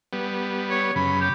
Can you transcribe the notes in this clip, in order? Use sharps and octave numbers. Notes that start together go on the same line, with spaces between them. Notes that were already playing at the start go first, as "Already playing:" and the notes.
G3 B3
C#5
F#2 C#3 B5
G4